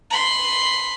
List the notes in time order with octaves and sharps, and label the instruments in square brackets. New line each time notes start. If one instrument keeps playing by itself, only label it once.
[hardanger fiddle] B5 C6